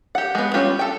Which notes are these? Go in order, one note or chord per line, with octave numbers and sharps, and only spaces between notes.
G4 F#5
G#3 B3
G3 C#4 F4 G4
A4 G5